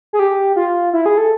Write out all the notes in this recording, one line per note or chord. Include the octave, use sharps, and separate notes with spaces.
G#4
G4
F4
E4
G#4
A4